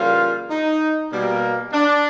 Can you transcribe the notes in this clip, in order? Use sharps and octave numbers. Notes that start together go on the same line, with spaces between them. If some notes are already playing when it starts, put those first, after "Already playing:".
Already playing: C#3 E3 G3 A#3 F4
D#4
B2 G3 A#3
D4